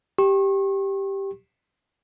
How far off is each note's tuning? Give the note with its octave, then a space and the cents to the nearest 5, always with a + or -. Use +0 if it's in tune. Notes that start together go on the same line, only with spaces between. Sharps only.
G4 +0 C#6 -40